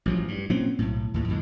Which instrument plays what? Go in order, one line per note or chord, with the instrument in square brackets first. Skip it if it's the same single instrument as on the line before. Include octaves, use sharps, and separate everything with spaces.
[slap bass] A1 F3 F#3
G2
A#2 F#3 C4 C#4
B1 A2
D#2 A2
F2 A2 D3 G#3